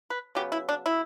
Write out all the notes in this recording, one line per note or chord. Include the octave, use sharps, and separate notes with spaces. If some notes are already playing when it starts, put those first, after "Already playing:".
B4
C#3 F#3 B3 G4
E4
D4
E4